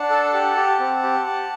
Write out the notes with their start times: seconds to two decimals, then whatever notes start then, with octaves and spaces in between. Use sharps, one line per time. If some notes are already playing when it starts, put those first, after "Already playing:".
Already playing: D4 F#5 A5
0.10 A4
0.34 G4
0.56 G4
0.80 C4
1.03 G4
1.26 G4